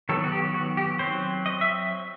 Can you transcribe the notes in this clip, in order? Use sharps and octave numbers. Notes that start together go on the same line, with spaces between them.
D#3 F#3 B3 A4
F#4
G4
F#4
G4
F#3 C4 C5
D#5
E5